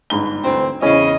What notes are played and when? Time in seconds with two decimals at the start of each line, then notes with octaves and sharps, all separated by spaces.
0.10 G1 G#2 G7
0.44 D2 E3 C4
0.82 E2 C#3 C#4 E4 D#5